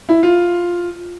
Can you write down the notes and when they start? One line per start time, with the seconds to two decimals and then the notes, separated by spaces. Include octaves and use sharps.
0.09 E4
0.23 F4